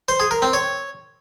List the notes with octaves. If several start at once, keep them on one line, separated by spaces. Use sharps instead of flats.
C5
G#4
A#4
C4
C#5